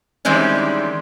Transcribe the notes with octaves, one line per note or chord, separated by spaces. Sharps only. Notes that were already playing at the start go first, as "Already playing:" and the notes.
D#3 E3 G3 G#3 C4 C#4